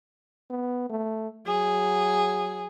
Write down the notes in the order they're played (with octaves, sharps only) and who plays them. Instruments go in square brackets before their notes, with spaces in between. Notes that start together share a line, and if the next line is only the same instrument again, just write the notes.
[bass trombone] B3
A3
[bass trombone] F#3 [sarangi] G#4